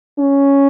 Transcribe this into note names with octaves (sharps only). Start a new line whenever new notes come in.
C#4